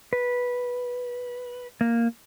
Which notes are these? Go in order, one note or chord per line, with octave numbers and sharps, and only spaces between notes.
B4
A#3